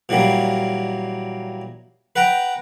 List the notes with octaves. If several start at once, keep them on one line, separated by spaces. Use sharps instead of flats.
A#2 E3 F#3 G3 A#3
B4 F#5 G5 A#5